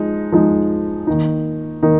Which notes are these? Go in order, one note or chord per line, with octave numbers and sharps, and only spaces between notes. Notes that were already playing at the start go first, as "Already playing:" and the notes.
Already playing: F3 G#3 D#4
F3 G#3 D#4
D#3 A#3 D#4
D#3 A#3 D#4